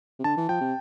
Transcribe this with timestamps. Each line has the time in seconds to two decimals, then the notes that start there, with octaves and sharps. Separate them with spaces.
0.19 C3
0.24 D3 A5
0.37 E3
0.49 F3 G5
0.61 C3